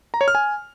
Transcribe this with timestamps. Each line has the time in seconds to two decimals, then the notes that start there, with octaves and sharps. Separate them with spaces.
0.14 A#5
0.21 C#5
0.28 F6
0.35 G#5